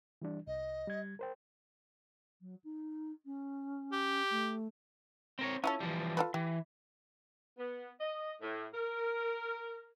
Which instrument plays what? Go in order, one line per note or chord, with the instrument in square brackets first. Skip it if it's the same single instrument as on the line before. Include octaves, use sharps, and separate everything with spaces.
[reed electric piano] E3 G3 D4
[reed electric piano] C2 [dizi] D#5
[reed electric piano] G3 G#6
A#4 C5 G5
[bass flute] F#3
D#4
C#4
[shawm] G4
[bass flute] A3
[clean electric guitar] C4 A#4 C#5
[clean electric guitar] C#4 [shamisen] E4 F4 A4
[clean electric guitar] E3 F3 G3
[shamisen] F4 A4 B4
[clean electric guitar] E3 [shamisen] G4
[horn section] B3
D#5
A2
A#4